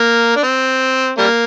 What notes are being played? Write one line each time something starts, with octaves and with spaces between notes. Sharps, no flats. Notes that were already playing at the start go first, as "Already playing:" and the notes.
Already playing: A#3
D4
C4
G3 A#3